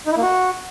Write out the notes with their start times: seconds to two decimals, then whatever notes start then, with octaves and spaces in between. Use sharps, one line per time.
0.07 D#4
0.12 E4
0.17 A#3
0.22 F#4